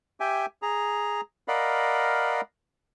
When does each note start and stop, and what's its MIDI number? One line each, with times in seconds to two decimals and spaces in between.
0.20 0.46 67
0.20 0.46 76
0.20 0.46 79
0.20 0.46 80
0.62 1.21 68
0.62 1.21 82
1.48 2.41 70
1.48 2.41 74
1.48 2.41 75
1.48 2.41 77
1.48 2.41 78
1.48 2.41 83